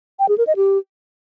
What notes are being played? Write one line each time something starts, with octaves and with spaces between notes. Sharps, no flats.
G5
G#4
A#4
D#5
G4